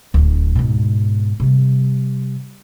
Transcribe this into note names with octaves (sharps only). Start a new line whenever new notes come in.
D1 D3
G#2 B2
C3 G3